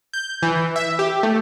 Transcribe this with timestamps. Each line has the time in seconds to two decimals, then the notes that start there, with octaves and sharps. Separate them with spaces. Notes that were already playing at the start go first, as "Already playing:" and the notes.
0.13 G6
0.43 E3
0.76 E5
0.99 G4
1.23 A3